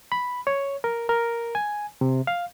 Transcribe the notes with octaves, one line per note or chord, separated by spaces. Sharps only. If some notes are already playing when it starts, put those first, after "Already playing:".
B5
C#5
A#4
A#4
G#5
C3
F5